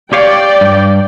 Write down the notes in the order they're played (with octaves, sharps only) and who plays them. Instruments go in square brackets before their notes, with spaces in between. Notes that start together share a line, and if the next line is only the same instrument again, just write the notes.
[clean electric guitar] G4 C#5 F5 [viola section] D5 G5
[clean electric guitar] G2